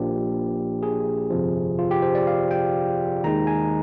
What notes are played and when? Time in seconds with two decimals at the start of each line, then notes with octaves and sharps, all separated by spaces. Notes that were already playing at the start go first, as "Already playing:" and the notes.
Already playing: A#1 A#2 F3 A#3 D4 G4
0.83 G#4
1.30 G1 F2 C3 F3
1.79 F4
1.91 G4
2.02 C5
2.15 D5
2.27 F5
2.51 G5
3.24 D#2 D#3 G#3 D#4 A#5
3.47 G#5